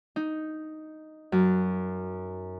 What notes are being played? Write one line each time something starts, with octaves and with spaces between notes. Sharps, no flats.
D#4
F#2